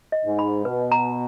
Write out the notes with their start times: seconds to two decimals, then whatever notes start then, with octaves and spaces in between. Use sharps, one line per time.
0.12 D#5
0.25 G#2
0.39 B5
0.65 B2 B4
0.92 A#5